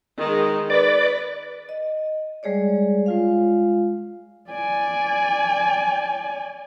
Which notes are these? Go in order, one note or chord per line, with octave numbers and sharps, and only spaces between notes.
D#3 G#3
B4 D5
D#5
G3 G#3 G#4 C#5 D5
G#3 F4 F5
D5 G#5